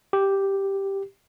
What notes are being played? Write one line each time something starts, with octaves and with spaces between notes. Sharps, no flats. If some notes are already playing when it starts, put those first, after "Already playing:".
G4